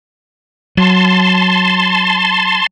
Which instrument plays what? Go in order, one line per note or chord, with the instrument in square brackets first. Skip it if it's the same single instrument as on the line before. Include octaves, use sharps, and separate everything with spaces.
[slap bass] F#3 [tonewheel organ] A5 C6